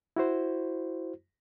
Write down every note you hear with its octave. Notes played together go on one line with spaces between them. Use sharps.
E4 F#4 C5